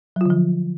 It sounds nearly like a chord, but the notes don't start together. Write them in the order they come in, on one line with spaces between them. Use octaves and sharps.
F#3 F4 D3 F3